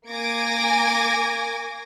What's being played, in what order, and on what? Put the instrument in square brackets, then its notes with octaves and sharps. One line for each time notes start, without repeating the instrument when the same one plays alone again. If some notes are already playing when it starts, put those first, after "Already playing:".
[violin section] A#3 G#5 D6 G#6 A#6 D7